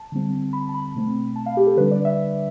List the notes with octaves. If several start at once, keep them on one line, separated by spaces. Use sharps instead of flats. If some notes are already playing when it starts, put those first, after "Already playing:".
Already playing: A5
D3 G3 C4
B5
A5
B5
B2 A3 C4
A5
F5
G4
A4
D3 G3 D4 B4
D5
E5